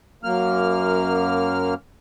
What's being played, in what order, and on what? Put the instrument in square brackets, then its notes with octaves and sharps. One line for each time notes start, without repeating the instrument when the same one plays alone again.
[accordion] F#2 A#3 F6